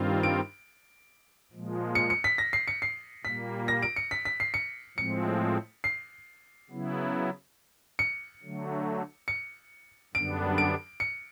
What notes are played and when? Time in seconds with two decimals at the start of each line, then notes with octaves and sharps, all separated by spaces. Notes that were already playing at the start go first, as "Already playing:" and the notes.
Already playing: G2 D#3 G3 C4 F4
0.23 D7
1.52 A#2 F3 G#3
1.95 C#7
2.10 C#7
2.24 B6
2.38 A#6
2.53 C7
2.68 C#7
2.82 C7
3.25 A#2 G3 A#3 B6
3.68 A#6
3.83 D7
3.96 C#7
4.11 B6
4.25 B6
4.40 C7
4.54 C#7
4.97 A2 F3 G#3 C4 C#7
5.84 C7
6.69 C#3 F#3 B3 E4
7.99 C#7
8.43 D3 F#3 A3
9.28 C#7
10.14 F#2 D3 G3 B3 D4 D7
10.58 D7
11.00 C#7